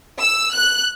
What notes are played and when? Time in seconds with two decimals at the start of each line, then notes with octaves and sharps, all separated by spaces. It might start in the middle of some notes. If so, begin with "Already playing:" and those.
0.21 E6
0.55 F#6